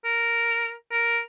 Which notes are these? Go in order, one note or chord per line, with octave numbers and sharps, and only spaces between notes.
A#4
A#4